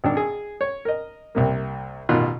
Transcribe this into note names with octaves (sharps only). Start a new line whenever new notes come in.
G#1 D4
G#4
C#5
A#4 D#5
C2 C3 A#3
A1 B2 D#3 F4 F#6